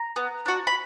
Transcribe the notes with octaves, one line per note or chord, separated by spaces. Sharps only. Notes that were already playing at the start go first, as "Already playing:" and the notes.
Already playing: A#5
B3
D4 F#4
B5